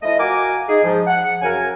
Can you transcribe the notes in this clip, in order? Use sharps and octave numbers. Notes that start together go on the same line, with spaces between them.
F3 A3 E4 D#5
F#4 A#4 F5 G#5 D6
D#4 G#4
G#2 F3
F#5
F#2 C#3 A#4 G#5